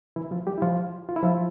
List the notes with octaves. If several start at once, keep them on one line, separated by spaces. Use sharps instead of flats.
E3 E4
F3 F4
G3 G4
E4
F3 F4
F4
E4
F3 F4